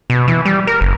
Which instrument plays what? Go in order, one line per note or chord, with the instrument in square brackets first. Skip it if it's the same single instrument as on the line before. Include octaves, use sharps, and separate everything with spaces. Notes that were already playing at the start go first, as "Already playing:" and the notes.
[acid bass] B2
E3
G3
A#4
F#1